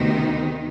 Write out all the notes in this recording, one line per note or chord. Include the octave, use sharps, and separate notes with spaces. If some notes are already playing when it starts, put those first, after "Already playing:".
Already playing: D2 C3 D#3 B3 D#4